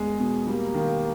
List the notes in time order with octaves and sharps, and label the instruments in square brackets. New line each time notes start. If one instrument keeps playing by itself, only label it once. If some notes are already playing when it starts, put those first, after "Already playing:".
Already playing: [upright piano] E2 G#3
B2
[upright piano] G3 [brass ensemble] A#3
[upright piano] D#3